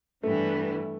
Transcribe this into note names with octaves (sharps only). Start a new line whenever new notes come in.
G2 E3 G3 A3 B3 E4